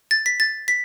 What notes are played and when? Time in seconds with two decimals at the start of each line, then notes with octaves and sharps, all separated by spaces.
0.11 A6
0.26 B6
0.40 A6
0.68 B6